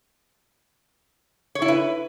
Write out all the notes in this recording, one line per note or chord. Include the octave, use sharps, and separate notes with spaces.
C#5
E4
B4